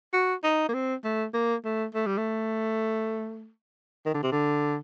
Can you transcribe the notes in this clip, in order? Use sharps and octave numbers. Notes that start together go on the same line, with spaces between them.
F#4
D#4
A#3
C4
A3
A#3
A3
A3
G3
A3
D#3
D3
C3
D3